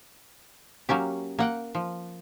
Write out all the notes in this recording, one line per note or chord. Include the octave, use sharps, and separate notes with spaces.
F#3 A#3 C#4 G4
A#3 F#5 G5
F3